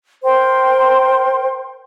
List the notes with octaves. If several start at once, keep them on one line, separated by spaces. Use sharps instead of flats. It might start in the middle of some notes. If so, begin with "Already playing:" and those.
A#4 C5 G5 C6